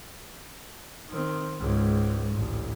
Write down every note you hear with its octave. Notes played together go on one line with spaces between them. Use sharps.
D#3 C4
C#2 G#2
A1 D2